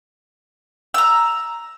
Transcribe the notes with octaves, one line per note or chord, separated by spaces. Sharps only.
A#5 E6